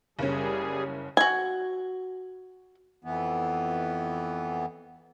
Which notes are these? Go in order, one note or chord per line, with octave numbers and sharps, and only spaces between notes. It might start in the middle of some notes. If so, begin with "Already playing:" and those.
F#1 G3 C#4 G#4
F#4 G#5
F2 E3 B3